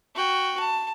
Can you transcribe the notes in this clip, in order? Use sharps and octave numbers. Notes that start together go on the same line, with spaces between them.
F#4 G5
A5